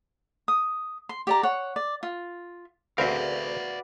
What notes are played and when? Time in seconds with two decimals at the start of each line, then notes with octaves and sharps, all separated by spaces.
0.48 D#6
1.09 C6
1.27 G4 D5 A#5
1.43 C#5 F#5
1.76 D5
2.03 F4
2.98 D2 C4 F#4 A#4 B4 D5 E5 F5